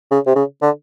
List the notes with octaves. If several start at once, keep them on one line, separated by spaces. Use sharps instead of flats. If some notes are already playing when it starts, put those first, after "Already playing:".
C#3
C3
C#3
D3